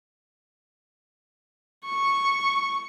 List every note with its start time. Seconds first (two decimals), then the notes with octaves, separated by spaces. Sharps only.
1.85 C#6